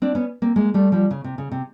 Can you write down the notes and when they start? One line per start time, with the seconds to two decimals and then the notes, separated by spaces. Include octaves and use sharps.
0.02 C4 D4
0.15 B3 C#4
0.42 A#3 C4
0.56 G#3 A#3
0.74 G3 A3
0.92 F3 G3
1.11 C#3
1.24 C3
1.38 C#3
1.51 C3